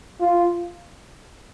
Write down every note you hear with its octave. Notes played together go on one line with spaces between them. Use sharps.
F4